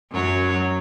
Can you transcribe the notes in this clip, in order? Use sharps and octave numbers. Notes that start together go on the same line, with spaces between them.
F#2 F#3 C#5